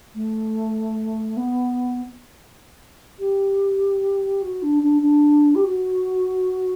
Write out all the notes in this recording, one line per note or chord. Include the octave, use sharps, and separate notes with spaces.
A3
B3
G4
F#4
D4
D4
D4
G4
F#4